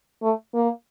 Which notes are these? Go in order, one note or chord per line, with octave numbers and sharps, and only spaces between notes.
A3
A#3